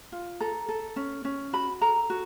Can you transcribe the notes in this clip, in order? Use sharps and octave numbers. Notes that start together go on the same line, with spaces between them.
F4
A4 A#5
A4
C#4
C#4
F#4 B5
A4 A#5
F#4